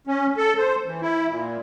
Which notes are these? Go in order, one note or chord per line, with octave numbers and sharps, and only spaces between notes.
C#4
A4
C5
E3
E4
A#2